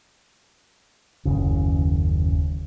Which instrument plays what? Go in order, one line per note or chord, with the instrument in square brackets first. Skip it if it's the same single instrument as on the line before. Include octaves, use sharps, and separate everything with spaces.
[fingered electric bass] F#1 D#2 C#3